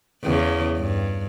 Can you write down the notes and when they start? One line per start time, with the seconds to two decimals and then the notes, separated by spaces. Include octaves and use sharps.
0.23 E2 C#3
0.78 G2